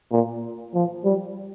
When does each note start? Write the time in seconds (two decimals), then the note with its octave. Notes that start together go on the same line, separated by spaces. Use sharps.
0.12 A#2
0.75 F3
1.05 G3